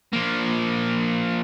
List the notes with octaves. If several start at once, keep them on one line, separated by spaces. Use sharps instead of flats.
F3 A#3